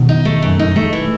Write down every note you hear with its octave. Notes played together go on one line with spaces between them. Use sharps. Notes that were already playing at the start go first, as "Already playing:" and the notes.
Already playing: B2 D#3
D#4
A3
F#2
D#4
A3
E3